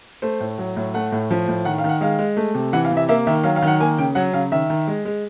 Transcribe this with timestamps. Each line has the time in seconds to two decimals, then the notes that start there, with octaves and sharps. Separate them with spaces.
0.22 A3 C5
0.40 A2
0.58 F#3
0.76 A2
0.94 A3 F#5
1.12 A2
1.31 F3
1.48 A2
1.65 D#3 F#5
1.78 F5
1.84 D#3 F#5
2.01 G#3 F5
2.19 G#3
2.37 A3
2.55 C3
2.73 E3 F#5
2.85 F5
2.91 C3
2.97 E5
3.09 A#3 E5
3.27 D#3 E5
3.44 F#3 F5
3.56 F5
3.62 D#3
3.67 F#5
3.79 A#3 G#5
3.98 C#3 G5
4.15 F#3 F#5
4.33 C#3 F5
4.52 D#3 E5
4.70 D#3
4.88 G#3
5.05 G#3